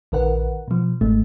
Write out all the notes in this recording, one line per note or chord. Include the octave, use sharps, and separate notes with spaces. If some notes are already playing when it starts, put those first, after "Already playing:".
A#1 D#3 A#4 B4 F#5
B2 F3
G#1 G#2 A3